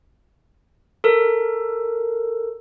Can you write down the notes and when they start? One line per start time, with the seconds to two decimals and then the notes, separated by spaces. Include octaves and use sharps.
1.04 A4 A#4